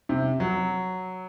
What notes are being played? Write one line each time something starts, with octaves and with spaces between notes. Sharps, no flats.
C3
F#3